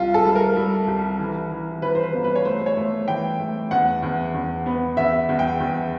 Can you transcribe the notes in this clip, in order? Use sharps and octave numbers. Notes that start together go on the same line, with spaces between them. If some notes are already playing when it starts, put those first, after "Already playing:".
Already playing: C2 F4
A4
G3
A#4
G3
C2
E3
E3
E3 B4
C5
B4
G1
B4
C#5
A3 C5
C#5
A3
E3 G5
A3
E2 F#5
E2
E2
B3
E2 E5
E2
G5
E2